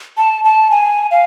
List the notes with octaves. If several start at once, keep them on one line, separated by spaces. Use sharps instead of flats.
A5
A5
G#5
F5